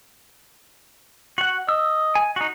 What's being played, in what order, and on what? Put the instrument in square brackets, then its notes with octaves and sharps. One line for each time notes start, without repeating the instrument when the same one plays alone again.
[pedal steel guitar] F#4 F#5
[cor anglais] D#5 [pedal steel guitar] E6
[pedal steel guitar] G#5
D#4 F#4